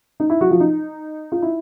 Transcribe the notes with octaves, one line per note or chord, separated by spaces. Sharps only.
D#4
E4
F#3 F#4
F3 F4
D#4
F4
E4